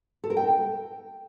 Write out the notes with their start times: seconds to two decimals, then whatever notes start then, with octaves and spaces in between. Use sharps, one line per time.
0.24 A4
0.30 A#4
0.37 G5